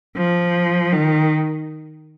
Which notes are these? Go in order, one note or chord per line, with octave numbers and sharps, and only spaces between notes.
F3
D#3